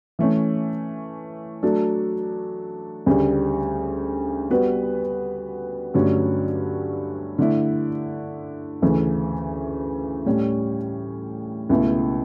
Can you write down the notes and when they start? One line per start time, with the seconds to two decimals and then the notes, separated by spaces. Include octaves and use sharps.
0.19 E3 A3 C#4
1.63 F#3 A3 D4 A4
3.06 D2 C#3 G3
4.50 G3 B3 F#4 B4
5.94 G2 D3 F#3 A3 C#4
7.39 D3 A3 E4
8.82 D2 C#3 E3 A3
10.26 A2 G3 C#4
11.69 C#2 B2 A3 E4